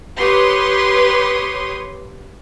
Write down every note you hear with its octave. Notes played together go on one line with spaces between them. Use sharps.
G4 B4 C#5 C6 D#6